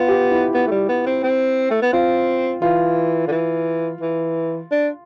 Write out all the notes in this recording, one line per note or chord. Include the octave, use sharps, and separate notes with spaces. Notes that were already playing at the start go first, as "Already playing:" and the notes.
Already playing: B3 F4
G4
E4
B3
A3
G3
B3
C4
C4
A3
B3
C4 F4
E3 F4
D3
E3
E3
D4